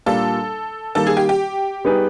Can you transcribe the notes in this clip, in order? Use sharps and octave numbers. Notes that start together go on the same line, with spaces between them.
A#2 G3 A#3 D4 F4 A4
D#3 G3 A#3 A4
G#4
G4
G4
G3 B3 D#4 G#4 B4